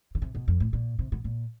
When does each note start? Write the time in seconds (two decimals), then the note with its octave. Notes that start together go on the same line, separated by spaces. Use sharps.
0.15 C#3
0.22 C3
0.35 B2
0.48 F2
0.60 A2
0.73 A#2
0.99 C3
1.12 B2
1.24 A#2